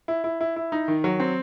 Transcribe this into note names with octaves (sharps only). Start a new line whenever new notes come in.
E4
E4
E4
E4
D#4
D#3
F#3
C4